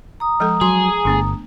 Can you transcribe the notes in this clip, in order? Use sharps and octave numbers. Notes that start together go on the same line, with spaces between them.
A#5 D#6
F3 G#3 A4
F#3 G#4 C6
G1 A3 B3 D4